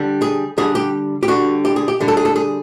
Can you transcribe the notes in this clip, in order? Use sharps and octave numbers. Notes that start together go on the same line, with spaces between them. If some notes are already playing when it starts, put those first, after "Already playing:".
Already playing: D3 G3
G#4
D3 G3 G#4
G4
G4
D3 G3 F#4
G4
G#4
G4
D3 G3
A4
G#4
A4
G#4